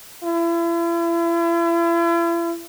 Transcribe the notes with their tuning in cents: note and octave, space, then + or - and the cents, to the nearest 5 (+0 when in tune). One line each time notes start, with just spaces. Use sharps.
E4 +40